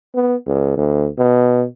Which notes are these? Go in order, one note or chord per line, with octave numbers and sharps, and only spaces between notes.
B3
C#2
D2
B2